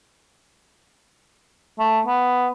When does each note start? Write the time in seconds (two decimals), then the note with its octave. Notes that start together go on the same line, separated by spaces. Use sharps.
1.79 A3
2.07 B3